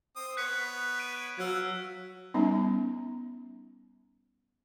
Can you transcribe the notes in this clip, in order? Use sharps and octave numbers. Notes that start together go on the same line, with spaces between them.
C4 D#6
B3 C#5 F#6 B6 C#7
F#6 D7 D#7
F#3 F#4 F5 E6 G#6
G3 B3 C#4 D#4